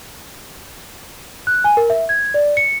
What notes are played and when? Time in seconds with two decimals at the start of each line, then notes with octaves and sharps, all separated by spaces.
1.47 F#6
1.64 G#5
1.77 A#4
1.90 E5
2.09 G#6
2.34 D5
2.57 C#7